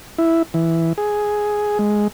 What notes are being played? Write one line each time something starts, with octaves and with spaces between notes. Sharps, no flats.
E4
E3
G#4
G#3